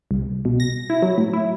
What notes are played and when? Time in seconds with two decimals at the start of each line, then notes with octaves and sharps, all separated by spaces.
0.11 C2
0.45 B2
0.60 A#6
0.90 E4
1.02 F#3
1.18 A2
1.33 E4